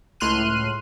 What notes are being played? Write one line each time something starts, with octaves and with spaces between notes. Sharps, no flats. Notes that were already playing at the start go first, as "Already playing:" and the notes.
C#2 A2 C6 F6 F#6 D#7